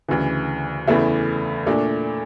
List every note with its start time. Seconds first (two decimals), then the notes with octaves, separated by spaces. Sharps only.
0.08 D2 C#3 E3
0.88 E2 C#3 E3 A3 E4
1.67 A#2 A3 D4